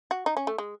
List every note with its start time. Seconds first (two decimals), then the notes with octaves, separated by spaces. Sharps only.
0.11 F#4
0.26 D#4
0.37 C#4
0.47 A3
0.58 G#3